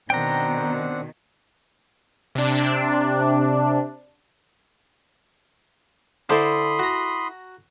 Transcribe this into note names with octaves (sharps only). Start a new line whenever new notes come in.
B2 D#3 C4 D4 F#5 G5 A#5
C3 D4
D3 E4 A4 C5 B5 C6 D#6
F#4 A#5